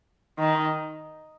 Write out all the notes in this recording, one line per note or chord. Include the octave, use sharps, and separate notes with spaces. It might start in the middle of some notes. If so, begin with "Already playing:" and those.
D#3